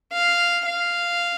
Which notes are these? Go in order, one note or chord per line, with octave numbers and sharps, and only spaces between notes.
F5
F5